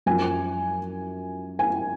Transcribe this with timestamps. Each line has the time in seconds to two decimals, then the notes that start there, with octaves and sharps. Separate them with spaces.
0.06 F#2 F3 G#5
1.59 G#5